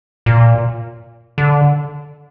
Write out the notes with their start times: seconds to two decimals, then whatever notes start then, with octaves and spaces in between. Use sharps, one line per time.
0.26 A#2
1.38 D3